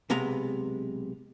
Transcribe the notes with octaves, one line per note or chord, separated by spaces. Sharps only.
B1 C3 G#3 B3 A#5